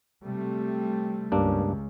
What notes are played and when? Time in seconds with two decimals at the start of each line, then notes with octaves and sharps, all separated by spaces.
0.25 C3 G3 A3
1.32 C#2 G2 A#3 D4